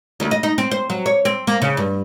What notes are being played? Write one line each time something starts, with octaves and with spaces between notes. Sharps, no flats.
D2
D#5
D#4
C4
C5
F#3
C#5
C4
A#3
C#3
G2